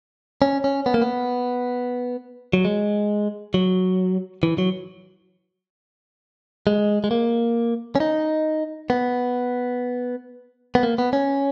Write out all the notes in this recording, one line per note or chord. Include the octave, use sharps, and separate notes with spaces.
C#4
C#4
B3
A#3
B3
F#3
G#3
F#3
E3
F#3
G#3
G#3
A#3
C#4
D#4
B3
B3
A#3
B3
C#4